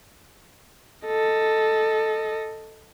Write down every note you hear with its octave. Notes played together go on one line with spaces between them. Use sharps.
A4 D#5